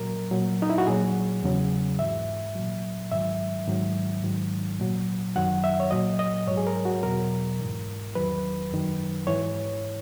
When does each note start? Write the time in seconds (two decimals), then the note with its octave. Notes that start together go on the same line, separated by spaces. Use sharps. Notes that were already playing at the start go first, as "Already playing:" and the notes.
Already playing: A#2 F#3 A#4
0.31 A#2 F#3
0.62 D#4
0.70 E4
0.78 F#4
0.87 A#2 F#3 G#4
1.43 E2 C#3 F#3
1.99 G#2 E3 E5
2.55 A#2 F#3
3.11 G#2 D#3 F#3 E5
3.68 G#2 D#3 F#3
4.24 G#2 D#3 F#3
4.79 A#2 F#3
5.36 F#2 D#3 F#3 F#5
5.64 E5
5.80 C#5
5.91 A#2 F#3 D#5
6.19 D#5
6.47 G#2 F#3 C#5
6.57 G#4
6.67 A#4
6.85 F#4
7.03 E2 B2 F#3 A#4
7.59 G#2 E3
8.15 E2 D#3 F#3 B4
8.71 F#2 D#3 F#3
9.27 G#2 E3 C#5